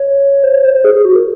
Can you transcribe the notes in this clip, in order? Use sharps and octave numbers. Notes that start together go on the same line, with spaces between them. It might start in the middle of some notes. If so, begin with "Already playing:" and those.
Already playing: C#5
C5
C#5
C5
C5
G#4
G#4
F#4
A#4